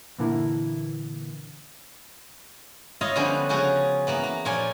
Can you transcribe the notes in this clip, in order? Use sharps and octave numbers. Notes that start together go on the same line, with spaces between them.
A#2 D3 E3 A#3 E4
E4 F4 C#5 D#5 F5
D3 F3 G3 B3 C#4 D4
C#3 F3 C#4 F#4 G#4
E3 A#3 B3
A#3
A#2 F3 C#5 D5 G#5